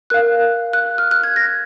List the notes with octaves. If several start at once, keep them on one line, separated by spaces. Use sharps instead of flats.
A#4 F5 F#6
F#6
F6
F#6
G#6
A#6